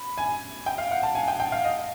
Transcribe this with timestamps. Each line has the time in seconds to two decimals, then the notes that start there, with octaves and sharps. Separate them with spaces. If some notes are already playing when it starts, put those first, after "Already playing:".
Already playing: B5
0.18 G#5
0.66 G5
0.78 F5
0.91 F#5
1.03 A5
1.15 G#5
1.28 G5
1.40 G5
1.52 F5
1.64 D#5